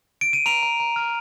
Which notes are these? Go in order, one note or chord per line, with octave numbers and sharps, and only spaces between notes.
D7
D#7
A#5 D7 F7
A#5
A#5
F6